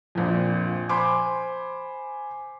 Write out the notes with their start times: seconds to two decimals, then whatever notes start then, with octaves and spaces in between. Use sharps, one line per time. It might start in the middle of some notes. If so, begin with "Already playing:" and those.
0.15 A#1 F2
0.89 C5 G#5 B5 C6 D6